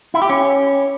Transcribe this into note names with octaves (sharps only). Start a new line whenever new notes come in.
E4
G4
C#4